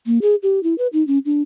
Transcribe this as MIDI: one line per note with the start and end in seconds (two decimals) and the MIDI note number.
0.06 0.19 58
0.22 0.35 68
0.43 0.62 67
0.63 0.76 64
0.78 0.87 71
0.93 1.06 63
1.07 1.19 61
1.26 1.42 62